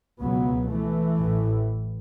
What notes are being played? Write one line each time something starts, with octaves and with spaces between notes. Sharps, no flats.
C#2 B2 F#3 B3
E3 A3
A1 A2